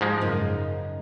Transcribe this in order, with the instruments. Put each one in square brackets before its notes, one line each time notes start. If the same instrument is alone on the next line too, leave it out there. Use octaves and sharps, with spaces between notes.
[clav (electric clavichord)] G#2 F3 G#3
[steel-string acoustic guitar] F#2 C#3 D#4